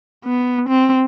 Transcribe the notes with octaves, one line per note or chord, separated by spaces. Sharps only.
B3
C4